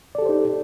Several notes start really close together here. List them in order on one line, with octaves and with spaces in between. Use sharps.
D5 A4 G4 C5 D#4